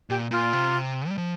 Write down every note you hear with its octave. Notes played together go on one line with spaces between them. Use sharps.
A#2 G4
A#2 F4
C3
G3
F3